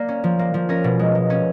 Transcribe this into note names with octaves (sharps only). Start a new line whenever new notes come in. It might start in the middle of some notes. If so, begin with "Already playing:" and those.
Already playing: A#3 D5
C#4
F3
A#3
F3
C#4 A#4
B2
G#3
G#3
C#4